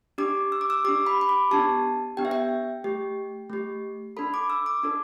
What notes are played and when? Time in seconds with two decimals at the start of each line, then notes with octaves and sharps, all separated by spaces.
0.18 D4 G4 D6
0.52 E6
0.61 D6
0.70 E6
0.85 D4 G4 D6
1.06 B5
1.21 B5
1.29 D6
1.51 B3 D4 G4 A5
2.17 B3 D4 G4 G5
2.25 E5
2.31 G5
2.84 A3 G4
3.50 A3 G4
4.17 D4 A4 B5
4.34 D6
4.50 E6
4.66 D6
4.84 D4 A4